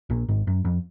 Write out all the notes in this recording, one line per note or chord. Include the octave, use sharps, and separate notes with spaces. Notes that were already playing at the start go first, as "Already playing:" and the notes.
A#1 A#2
G#1 G#2
F#2
F2